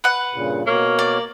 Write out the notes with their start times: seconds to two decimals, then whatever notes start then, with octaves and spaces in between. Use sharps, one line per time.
0.04 B4 F#5
0.34 G2 A#2 C#3
0.67 B2 A#3 C#5 F6
0.99 D5